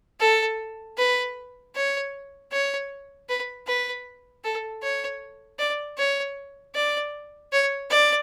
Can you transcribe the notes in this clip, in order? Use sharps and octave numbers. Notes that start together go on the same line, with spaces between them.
A4
B4
C#5
C#5
B4
B4
A4
C#5
D5
C#5
D5
C#5
D5